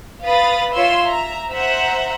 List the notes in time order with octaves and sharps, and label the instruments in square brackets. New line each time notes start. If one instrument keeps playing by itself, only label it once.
[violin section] B4 F5 B5 D#6 A6
F4 C#5 E5 F5 C6 E6
E5 A#5
C5 E5 F#5 A#5